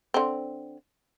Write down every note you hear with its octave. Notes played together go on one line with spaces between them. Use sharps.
D3 C4